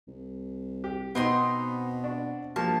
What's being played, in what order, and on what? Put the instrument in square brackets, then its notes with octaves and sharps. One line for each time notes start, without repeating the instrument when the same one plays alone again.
[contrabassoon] C2
[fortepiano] G4
[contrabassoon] B2 [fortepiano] B3 D#4 [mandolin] C4 D#5 C6
[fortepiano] D4 F#4
[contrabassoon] G2 [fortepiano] F3 A#3 G4 [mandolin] A5